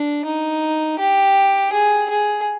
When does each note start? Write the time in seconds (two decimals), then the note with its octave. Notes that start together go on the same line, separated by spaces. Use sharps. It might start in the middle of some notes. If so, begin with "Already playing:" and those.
Already playing: D4
0.25 D#4
0.99 G4
1.73 G#4
2.10 G#4